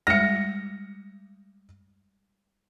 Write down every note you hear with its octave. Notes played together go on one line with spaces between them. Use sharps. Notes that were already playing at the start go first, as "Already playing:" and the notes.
G3 G#3 A#6 C#7